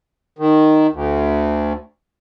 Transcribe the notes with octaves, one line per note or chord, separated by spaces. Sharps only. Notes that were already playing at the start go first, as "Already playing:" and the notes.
D#3
D2